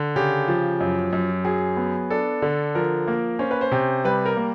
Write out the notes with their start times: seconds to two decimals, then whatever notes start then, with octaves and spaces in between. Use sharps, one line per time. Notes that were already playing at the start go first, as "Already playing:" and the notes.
Already playing: D3
0.16 C#3 G4
0.48 F3
0.81 F#2
1.13 F#2
1.45 F#3 G#4
1.77 B3
2.10 D4 A4
2.42 D3
2.75 F3 A#4
3.08 A#3
3.39 C#4 C5
3.51 B4
3.61 C5
3.72 C3
4.04 G3 B4
4.26 A#4
4.37 A#3